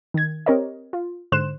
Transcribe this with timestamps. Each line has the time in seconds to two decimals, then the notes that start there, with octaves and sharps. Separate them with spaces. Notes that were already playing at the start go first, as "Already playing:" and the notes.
0.14 D#3 G#6
0.46 C4 G4 A#4 C#5 D#5
0.93 F4
1.32 G#2 D3 C5 C6 F#6 E7